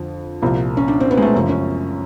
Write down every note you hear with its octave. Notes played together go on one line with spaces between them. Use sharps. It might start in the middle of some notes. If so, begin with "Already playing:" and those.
Already playing: F2 D3 F3
C2 A#2 F3
C#4
D4
C4
B3
G#3
A3
F#2 C#3 F3
C#4